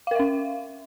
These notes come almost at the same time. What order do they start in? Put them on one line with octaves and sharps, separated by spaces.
F5 A#4 E5 C#4